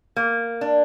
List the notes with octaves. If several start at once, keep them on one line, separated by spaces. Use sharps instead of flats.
A#3
D4